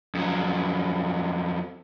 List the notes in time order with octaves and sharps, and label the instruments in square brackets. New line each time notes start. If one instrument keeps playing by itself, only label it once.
[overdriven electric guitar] F2 F#3